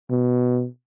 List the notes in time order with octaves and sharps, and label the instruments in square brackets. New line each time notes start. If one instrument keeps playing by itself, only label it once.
[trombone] B2